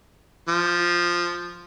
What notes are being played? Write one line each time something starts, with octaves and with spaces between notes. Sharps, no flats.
F3